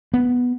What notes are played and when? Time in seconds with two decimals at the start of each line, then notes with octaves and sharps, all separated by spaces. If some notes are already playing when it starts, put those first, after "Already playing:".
0.14 B3